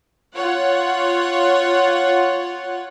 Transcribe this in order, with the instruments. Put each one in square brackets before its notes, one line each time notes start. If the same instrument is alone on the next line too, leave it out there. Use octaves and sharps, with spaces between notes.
[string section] F4 C#5 F#5